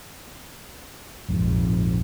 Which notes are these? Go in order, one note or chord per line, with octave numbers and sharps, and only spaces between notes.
A#1 F2 G#2